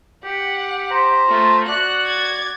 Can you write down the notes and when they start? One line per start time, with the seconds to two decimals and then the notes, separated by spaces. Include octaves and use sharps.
0.25 G4 F#5
0.91 C5 A#5
1.29 A3 F4
1.68 F#4 D5 F#6
2.07 G#6 A6